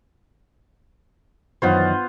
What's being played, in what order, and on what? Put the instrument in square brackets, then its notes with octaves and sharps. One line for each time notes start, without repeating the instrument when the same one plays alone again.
[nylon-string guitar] F#2 D#3 E3 [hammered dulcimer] B3 F4 C5